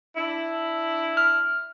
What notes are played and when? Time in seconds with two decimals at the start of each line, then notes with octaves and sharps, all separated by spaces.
0.17 D4 E4
1.17 F6